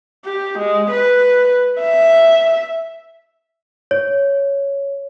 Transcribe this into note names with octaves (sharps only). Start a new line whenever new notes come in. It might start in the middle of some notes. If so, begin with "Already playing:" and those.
G4
G#3
B4
E5
C#5